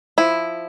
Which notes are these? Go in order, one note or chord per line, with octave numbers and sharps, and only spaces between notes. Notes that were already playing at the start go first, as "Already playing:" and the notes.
F3 E4